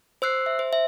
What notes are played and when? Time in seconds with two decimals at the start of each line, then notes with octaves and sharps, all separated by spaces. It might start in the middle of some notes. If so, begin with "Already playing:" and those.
0.22 C5 E6 F#6 C7
0.46 E5
0.59 C5
0.73 E5